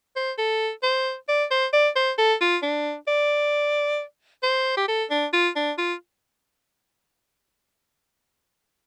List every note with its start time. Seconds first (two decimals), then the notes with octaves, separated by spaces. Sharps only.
0.16 C5
0.38 A4
0.83 C5
1.29 D5
1.51 C5
1.73 D5
1.96 C5
2.18 A4
2.41 F4
2.63 D4
3.08 D5
4.43 C5
4.77 G4
4.88 A4
5.11 D4
5.33 F4
5.56 D4
5.78 F4